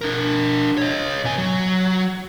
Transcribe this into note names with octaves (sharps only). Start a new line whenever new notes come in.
D4 A#4
C#5 D#5
C3 G#5
F#3